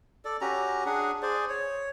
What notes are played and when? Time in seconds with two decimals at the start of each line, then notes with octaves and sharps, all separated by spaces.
0.25 A4 D5
0.41 C#4 F#4 G4 A#5
0.86 D4 G#4 F#5
1.22 G#4 C5 D5
1.49 C#5